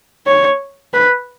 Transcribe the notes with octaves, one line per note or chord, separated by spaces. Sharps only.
C#5
B4